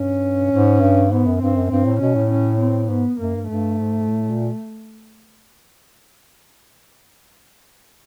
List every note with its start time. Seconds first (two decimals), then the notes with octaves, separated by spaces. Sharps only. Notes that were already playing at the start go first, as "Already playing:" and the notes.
Already playing: G2 C#4
0.51 G#2
0.81 G2
1.11 G#2 B3
1.26 F#2
1.41 G2 C4
1.56 F#2
1.71 G2 C4
1.85 A2
2.00 B2 C#4
2.15 A2
2.31 C#4
2.60 C4
2.89 G#2 B3
3.19 F#2 A#3
3.35 G2
3.49 G2 A3
3.79 G#2
4.08 A2
4.29 A#2